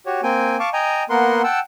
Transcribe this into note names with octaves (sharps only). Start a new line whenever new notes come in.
F#4 G4 C#5
A#3 C4 G5 G#5
F5 A5 C#6 D6
D#5 G5 G#5 A#5
A#3 B3 A#4 F#5 C6
F#5 G5 A5 E6